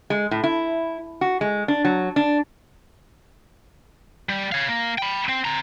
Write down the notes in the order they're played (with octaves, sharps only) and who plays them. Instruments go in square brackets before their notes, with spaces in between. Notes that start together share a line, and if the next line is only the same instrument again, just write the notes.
[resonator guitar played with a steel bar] G#3
A2
E4
F#4
G#3
D4
F#3
D4
[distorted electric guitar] G3
C#5 F5
A#3
G5 B5
C4
C4 A#5